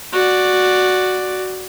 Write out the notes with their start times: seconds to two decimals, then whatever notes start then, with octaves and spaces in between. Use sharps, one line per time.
0.13 F#4 D5